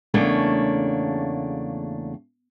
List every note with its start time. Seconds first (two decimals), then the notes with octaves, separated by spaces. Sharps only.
0.14 E2 C#3 A3 A#3 D4 C#5